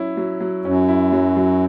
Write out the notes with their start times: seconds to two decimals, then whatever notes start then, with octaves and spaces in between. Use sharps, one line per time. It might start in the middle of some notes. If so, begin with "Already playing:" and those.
Already playing: F#3 C#4 E4
0.17 F#3
0.40 F#3
0.65 F#2 C#4
0.88 E4
1.12 F#3
1.37 F#3